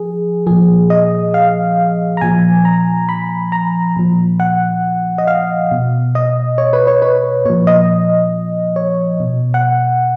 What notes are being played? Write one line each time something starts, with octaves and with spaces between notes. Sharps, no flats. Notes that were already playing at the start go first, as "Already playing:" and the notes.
Already playing: F3 G#4
A#2 F3 G#4
D#5
F5
A#5
A#2 F3 G#5
A#5
B5
A#5
A#2 F3
F#5
D#5
F5
B2
D#5
C#5
B4
C#5
B4
A#2 F3 C#5
D#5
C#5
B2
F#5